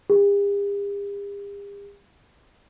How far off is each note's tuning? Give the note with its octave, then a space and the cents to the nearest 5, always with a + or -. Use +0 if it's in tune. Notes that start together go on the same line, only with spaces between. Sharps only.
G4 +45